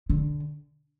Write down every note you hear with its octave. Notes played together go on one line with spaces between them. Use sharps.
D3